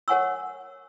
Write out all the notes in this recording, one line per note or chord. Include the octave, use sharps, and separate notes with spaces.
A#4 C#5 F#5 G#5 C#6 E6